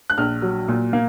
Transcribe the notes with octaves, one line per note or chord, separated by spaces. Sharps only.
F#6
A#1 F6
F#3
A#2
A#3